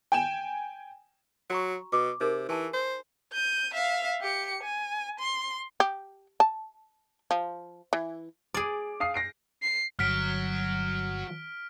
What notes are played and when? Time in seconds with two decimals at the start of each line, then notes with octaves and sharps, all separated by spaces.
0.12 G5 G#5 E7
1.50 F#3 F#4 A#5 C#6
1.93 B2 D6
2.21 C3 D#4 G#4 A#4
2.49 E3 G4 G#5 A5
2.74 C5
3.33 G6 D#7
3.74 E5 F5
4.21 G4 C#7
4.63 G#5
5.20 C6
5.80 G4
6.40 A5
7.31 F3
7.93 E3
8.54 G#4 D5 D6 D7
9.00 F5 D#6 C7
9.14 A#6 C7 D7
9.62 C7
9.99 G1 F#3 F6 B6 D7